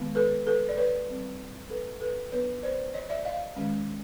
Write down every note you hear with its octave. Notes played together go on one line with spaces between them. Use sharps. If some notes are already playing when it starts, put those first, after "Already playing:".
Already playing: D#3 G#3 B3
A4 B4
A4 B4
D5
B4 C#5
G3 C4
A4 B4
A4 B4
F#3 B3 D4 B4 C#5
C5 D5
C#5 D#5
D5 E5
D#5 F5
D#3 G#3 C#4